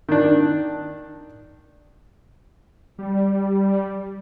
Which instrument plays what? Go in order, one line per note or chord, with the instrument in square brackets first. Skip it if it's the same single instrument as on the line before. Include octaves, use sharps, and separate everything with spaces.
[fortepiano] D#3 D4
[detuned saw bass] G3